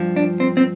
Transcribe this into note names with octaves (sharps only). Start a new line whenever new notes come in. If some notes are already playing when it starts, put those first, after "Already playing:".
Already playing: G2 F3
D4
C4
C4